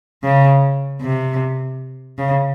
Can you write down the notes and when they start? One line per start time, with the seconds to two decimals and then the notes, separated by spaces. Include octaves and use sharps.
0.23 C#3
1.01 C3
2.18 C#3